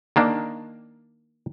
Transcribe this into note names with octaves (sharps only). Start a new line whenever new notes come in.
D#3 A#3 D4